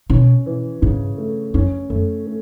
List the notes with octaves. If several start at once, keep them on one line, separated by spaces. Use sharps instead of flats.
B2 C#4
E3
G#2 C#3
A3
F#2 C#4
F#2 A3
A3